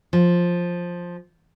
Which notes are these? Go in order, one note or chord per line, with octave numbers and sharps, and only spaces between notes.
F3